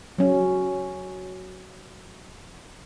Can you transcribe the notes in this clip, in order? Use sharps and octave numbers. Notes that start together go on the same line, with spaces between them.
F#3 C#4